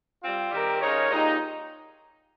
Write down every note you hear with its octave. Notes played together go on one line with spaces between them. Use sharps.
G3 C4 F4
D#3 G3 C4 G4 A#4
C#3 G#3 D#4 A#4 C#5
A#2 G#3 D#4 G4